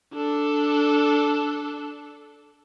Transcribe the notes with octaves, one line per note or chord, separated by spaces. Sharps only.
D4 A4